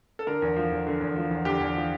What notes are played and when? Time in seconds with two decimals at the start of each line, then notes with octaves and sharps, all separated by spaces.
0.19 A4
0.27 D3 A#4
0.42 E2
0.56 F3
0.71 E2
0.87 D3
1.01 E2
1.16 F3
1.31 E2
1.45 D3 G4
1.60 E2
1.75 F3